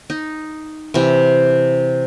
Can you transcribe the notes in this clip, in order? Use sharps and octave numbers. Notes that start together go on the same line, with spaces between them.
D#4
C3 E3